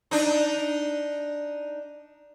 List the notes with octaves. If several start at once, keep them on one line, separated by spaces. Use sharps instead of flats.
D4 D#4